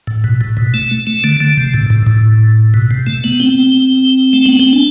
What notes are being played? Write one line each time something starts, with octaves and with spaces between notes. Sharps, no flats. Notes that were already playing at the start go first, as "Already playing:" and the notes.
A2
B2
A2
B2
A3
A3
D3
D3
C3
A2
A2
A2
B2
C3
A3
B3
C4
A3
B3
C4
D4